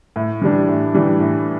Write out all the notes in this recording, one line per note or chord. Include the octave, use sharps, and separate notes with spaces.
A2
E3 G3 D4
A2
E3 G3 D4
A2